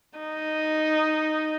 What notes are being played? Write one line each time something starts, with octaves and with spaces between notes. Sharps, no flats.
D#4